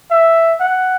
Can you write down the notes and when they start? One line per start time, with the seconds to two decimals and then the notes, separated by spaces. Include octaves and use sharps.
0.11 E5
0.60 F#5